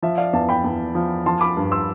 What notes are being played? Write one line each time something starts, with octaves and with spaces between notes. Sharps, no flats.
F3 E5
D5 F5
E2 F5 A5
G5 B5
E2
F3
F3 A5 C6
B5 D6
G2
C6 E6